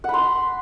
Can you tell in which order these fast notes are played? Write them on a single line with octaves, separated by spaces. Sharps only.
F#5 B5 C6